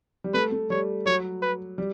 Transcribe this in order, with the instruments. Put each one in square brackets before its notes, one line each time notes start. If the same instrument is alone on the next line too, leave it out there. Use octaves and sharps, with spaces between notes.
[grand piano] G3
[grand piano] A3 [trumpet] B4
[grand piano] A3
[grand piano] G3 [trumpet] C#5
[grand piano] F#3 [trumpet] C#5
[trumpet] B4
[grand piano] G3